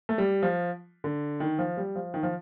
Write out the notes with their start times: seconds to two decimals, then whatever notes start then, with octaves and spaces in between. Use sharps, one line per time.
0.09 A3
0.18 G3
0.43 F3
1.04 D3
1.40 D#3
1.59 F3
1.77 G3
1.96 F3
2.14 D#3
2.23 F3